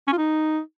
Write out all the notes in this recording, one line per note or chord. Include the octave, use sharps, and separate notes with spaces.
C#4
F4
D#4